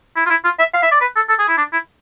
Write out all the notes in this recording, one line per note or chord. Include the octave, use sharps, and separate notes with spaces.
E4
F4
E4
F4
E5
F5
E5
D5
B4
A4
A4
G#4
E4
D4
E4